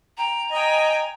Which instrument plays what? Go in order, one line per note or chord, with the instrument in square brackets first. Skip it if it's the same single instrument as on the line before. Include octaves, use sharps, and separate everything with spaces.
[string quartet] G5 [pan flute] A#5
[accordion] D#5 [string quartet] G5 G#5